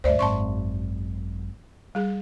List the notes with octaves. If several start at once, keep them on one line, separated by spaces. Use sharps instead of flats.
D2 G2 C5 D5 E5
G#1 F#2 A5 C6 C#6
G3 G#4